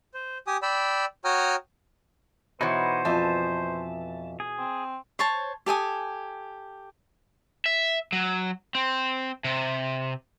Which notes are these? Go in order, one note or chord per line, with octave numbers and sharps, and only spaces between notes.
C5
G4 G#5 D#6
D5 G5 B5 E6
F#4 C#5 G5 A#5 D#6 F6
B2 E3 D#4 C5 C#5 F#5
F2 E5 G#5 A5
G#4
C4
C5 C#5 A5
G4 A4 G#5 D#6
E5
F#3
C4
C3